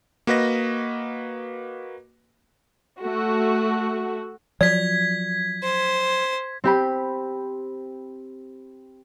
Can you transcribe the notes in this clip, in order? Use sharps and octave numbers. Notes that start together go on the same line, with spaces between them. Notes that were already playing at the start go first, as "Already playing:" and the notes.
A#3 F#4 B4 D#5 A#6
A3 F#4
F3 F#3 D5 G#6 B6
C5
C4 G4 B5